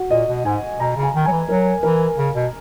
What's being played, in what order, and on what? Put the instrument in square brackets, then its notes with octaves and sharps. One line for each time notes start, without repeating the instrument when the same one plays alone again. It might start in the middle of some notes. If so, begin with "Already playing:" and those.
Already playing: [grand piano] F#4
[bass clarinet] A#2 [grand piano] D#5
[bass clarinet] B2
[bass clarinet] G#2 [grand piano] G#5
[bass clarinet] B2 [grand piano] A#5
[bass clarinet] C#3
[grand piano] G#5
[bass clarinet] D#3
[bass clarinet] F#3 [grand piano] G#5
[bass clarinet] E3
[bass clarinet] F#3 [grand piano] A#4
[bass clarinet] E3 [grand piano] A#4
[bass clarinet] C#3
B2